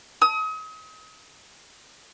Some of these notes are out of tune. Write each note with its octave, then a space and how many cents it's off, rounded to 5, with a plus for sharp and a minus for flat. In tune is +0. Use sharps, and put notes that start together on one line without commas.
D#6 +35